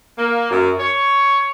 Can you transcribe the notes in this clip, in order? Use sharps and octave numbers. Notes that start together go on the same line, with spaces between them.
A#3
F#2
C#5